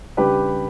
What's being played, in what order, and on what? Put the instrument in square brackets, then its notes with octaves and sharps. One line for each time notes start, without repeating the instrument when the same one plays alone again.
[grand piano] C#3 G3 D4 G4 B4